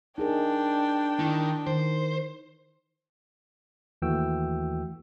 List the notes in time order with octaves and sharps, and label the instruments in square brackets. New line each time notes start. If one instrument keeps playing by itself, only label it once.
[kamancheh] D4 G5 [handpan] D#4 G#4 A#4
[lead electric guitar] D#3 [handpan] E4
[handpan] D#3 [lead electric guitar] C5
[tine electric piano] D#2 E3 A3 F#4 G5 E6